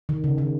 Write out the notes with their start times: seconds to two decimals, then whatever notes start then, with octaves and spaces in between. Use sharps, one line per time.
0.09 D#3
0.24 C#3
0.38 D#3